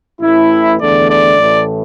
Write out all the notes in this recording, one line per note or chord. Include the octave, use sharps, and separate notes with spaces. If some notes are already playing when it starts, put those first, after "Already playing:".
A1 A2 E3 A3 E4
E2 D3 A3 D5
D5
A1 A2 E3 A3